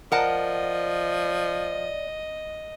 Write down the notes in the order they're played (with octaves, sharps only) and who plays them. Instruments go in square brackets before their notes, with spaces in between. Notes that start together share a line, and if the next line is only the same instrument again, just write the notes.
[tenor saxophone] F3 [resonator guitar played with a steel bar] A#4 F#5 A5 [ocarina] D5 [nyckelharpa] D#5